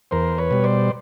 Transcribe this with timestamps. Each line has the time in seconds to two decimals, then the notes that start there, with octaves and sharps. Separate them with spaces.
0.11 E2 A#4 C5
0.38 B4 C#5
0.51 B2 G3
0.64 C5 D5